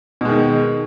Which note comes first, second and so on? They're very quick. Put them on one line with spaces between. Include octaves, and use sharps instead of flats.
B2 G#3 D#3